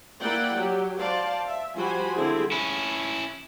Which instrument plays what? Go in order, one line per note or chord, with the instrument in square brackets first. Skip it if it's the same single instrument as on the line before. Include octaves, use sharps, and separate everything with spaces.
[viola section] A#3 E4 D5 F#5 G5
F#3 G4
C5 D5 F5 A5
E5
F3 G3 F#4 C5 G#5 B5
D3 G3 C4 E4 G#4 E5
[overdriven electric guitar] C#4 E4